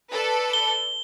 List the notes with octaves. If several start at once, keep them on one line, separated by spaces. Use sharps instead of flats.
A4 B4 D5
G7